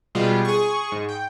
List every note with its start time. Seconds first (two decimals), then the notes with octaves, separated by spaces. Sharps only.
0.15 B2 G3 G#3 B3 F4 G4
0.45 G#4 C#6
0.92 G#2
1.09 G5